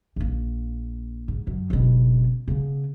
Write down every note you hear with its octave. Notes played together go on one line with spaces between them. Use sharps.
A#1 A#3
G#2
F#2
F#1 B2
C#3 B3